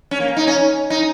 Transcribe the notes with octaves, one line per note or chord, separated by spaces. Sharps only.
C#4
A#3
D#4
C#4
D#4